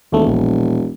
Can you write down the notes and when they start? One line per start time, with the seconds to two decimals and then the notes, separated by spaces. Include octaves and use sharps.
0.12 E1 D#2 A3
0.27 A#1